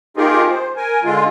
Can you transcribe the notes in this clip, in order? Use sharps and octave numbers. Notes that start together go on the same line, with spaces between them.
A#3 D#4 F4 G4 G#4 A#4
C5
A#4 G#5
D3 G#3 F4